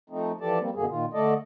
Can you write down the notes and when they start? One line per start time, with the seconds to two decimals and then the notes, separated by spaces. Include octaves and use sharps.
0.10 F3 A3 C4 D#4
0.41 E3 F3 G4 A4 D5 A5
0.59 G3 A#3 C4
0.75 F#2 B2 D3 A#3 G#4
0.90 A#2 D#3 F4
1.13 D3 A3 A4 D5 D#5